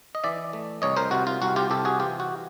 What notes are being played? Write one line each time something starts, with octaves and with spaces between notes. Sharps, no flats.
D#5
E3 D5 E5
A3
C2 C#5 D#5
A#4 C5
C3 F#4
F4
C2 F#4
F4 G4
C3 G4 A4
F#4 G#4
E3 F4 G4
F#4